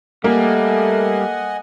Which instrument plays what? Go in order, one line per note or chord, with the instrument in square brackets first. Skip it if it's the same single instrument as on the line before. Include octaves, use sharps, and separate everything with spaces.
[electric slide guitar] G3 [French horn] A3 [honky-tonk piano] A#3 [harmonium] D#5 F#5 G#5